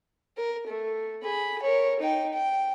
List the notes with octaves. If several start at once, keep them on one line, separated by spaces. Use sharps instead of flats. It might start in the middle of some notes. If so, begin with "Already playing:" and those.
A#4
A3
G#4 B5
A#4 C#5
D#4 G5
G5